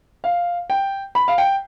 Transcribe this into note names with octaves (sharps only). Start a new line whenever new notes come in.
F5
G5
B5
F5
G5